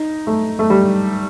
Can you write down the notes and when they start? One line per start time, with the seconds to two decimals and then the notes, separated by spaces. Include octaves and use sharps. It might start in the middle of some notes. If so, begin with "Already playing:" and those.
Already playing: D#4
0.27 A3
0.59 A3
0.70 G3